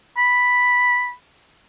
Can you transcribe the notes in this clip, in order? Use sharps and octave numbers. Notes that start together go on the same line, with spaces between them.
B5